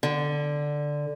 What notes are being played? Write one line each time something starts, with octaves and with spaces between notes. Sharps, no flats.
D3